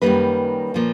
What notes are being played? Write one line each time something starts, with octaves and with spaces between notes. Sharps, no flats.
F#2 D#3 G3 A#3 B4
A#2 F3 A#3